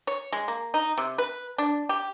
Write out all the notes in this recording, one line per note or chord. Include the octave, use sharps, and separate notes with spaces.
C#5
G#3
A#3
D#4
C3
B4
D4
G4